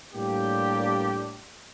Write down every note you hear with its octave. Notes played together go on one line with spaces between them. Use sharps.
A2 G3 A#3 D4 G4